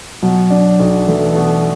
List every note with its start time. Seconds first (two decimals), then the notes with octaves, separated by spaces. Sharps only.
0.22 B2 F#3
0.50 D4
0.80 B1
1.07 E3 A3
1.35 B2